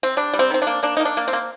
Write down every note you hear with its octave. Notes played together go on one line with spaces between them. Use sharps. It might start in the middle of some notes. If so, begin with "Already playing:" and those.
C4
G3 D4
G3
C4
D#3 C4
D4
A#3
A#3 D4
A#3 D#4
D4
A#3
C4
A#3